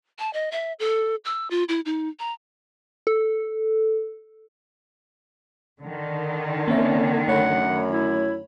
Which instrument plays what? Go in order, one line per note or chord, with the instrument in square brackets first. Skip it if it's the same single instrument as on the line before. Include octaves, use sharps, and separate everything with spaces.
[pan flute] A5
D#5
E5
A4
E6
F4
E4
D#4
A#5
[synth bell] A4
[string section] D3 D#3
[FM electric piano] A#3 C4 E5 [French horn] C#4
[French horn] F#2 [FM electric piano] A3 C#5 B5 [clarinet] F#5
[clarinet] E4